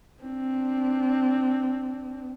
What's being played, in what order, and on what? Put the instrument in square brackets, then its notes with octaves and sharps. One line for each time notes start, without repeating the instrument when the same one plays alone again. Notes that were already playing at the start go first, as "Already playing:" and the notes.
[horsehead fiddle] C4 D4